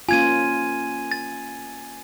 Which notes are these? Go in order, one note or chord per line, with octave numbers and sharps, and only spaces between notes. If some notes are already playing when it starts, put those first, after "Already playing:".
A#3 C#4 F4 G#5 G#6 D#7
A6